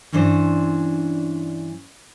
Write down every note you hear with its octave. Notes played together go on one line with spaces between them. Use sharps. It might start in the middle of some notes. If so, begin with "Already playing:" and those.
G2 E3 C#4 D4 C5